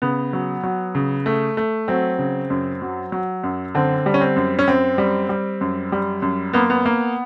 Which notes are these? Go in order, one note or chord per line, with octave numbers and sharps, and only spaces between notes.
C#3 B3
F#3
F#3
C#3
A3
A3
F#3 C4
C#3
F#2
F#3
F#3
F#2
D3 C4
G3
C#4
C4
F#2
C#4
F#2 C4
G3
G3
F#2
G3
F#2
A#3 B3
B3
A#3